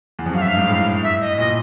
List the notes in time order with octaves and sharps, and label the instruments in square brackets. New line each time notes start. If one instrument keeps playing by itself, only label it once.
[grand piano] E2
F2
[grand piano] F#2 [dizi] F5
[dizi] E5
[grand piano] G2 [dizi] F5
[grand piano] G#2
A2
[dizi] E5
D#5
[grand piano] A#2 [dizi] D#5